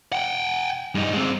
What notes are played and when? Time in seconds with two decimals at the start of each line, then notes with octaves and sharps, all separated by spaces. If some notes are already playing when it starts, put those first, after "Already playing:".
0.13 F#5 G5
0.95 G2 D#4
1.13 G#3 C4